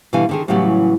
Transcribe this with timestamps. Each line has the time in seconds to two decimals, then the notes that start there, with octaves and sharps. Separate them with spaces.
0.13 B2 D3 E3 G3 F5 G#5
0.29 D3 D#3 G#4
0.48 A2 C#3 E3 F#3 G3 B3